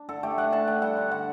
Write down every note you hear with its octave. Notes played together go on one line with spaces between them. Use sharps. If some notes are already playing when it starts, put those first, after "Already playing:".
Already playing: D4
D3 A4
A3 G4
A3 F#5
D3 A5
D3 G5
G3 F#5
D3
D3 F#5